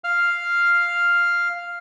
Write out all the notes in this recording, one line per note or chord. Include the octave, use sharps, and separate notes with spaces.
F5 F6